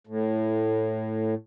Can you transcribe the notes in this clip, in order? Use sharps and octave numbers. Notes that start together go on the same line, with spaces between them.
A2